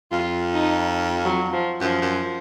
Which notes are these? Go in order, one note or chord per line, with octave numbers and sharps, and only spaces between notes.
F2 F4
D#4
F#3
F3
F#2 F3
F#2